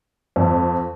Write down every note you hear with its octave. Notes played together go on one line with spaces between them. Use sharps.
F2